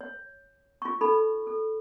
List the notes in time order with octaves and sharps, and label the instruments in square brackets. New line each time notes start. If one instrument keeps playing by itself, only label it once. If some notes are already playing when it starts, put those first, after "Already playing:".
[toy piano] C#5
F4 C#6
D#4 A4 B5
A4